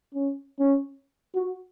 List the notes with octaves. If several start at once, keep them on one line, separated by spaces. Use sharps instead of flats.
C#4
C#4
F#4